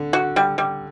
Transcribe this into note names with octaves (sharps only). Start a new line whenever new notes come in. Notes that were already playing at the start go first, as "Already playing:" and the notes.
Already playing: D3
F#4
G3
G3